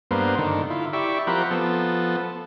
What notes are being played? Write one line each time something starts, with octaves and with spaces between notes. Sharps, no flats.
G2 A#3 B3 C5
D3 D#3
E4 F4
E4 G4 D5 E5 C#6
F3 C4 G4 A#4 F#5 B5
F3 B3 A4